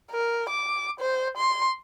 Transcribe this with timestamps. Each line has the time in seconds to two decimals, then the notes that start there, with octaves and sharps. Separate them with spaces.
0.11 A#4
0.49 D6
1.00 C5
1.37 C6